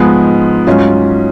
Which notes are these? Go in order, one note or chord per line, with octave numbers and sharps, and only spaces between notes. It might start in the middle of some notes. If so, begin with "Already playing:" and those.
Already playing: G#2 F3 G#3 B3
G#2 F#3 C#4 F4